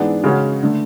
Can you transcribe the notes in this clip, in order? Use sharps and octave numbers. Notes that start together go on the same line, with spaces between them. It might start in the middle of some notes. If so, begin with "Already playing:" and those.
Already playing: G#2 E3 B3 D4 G#4
C#3 G#3 C#4 F#4
D3 A3